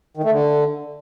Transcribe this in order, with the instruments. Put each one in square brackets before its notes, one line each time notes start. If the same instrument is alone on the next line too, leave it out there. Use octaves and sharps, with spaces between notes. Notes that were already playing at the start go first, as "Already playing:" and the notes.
[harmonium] D#3
A3
D3